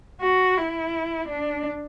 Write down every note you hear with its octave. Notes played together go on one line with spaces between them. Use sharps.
F#4
E4
D4